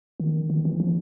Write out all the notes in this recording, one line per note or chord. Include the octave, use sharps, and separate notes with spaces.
D#3
D#3
E3
F3